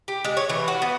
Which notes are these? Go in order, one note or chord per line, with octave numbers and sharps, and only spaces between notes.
G4
G#3
C#5
E3
F#4
B3